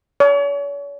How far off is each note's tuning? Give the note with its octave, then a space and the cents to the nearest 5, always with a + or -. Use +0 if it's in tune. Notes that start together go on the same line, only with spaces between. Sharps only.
C#5 +40